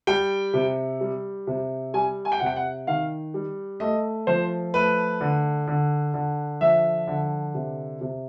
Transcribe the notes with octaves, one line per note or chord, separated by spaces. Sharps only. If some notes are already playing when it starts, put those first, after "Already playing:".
G3 G5
C3
G3
C3
G3 G#5
G#5
G5
C3 F#5
G5
F#5
D#3 F5
G3
A3 D#5
F3 C5
A3 B4
D3
D3
D3
F3 E5
D3
C3
C3